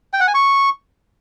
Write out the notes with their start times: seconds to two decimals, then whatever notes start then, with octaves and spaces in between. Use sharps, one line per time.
0.13 G5
0.20 F#5
0.27 G#5
0.34 C#6